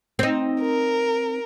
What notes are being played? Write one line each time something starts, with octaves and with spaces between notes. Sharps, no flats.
C4 D#4
A#4